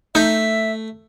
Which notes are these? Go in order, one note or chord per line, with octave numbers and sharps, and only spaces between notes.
A3 D#4 E5 G6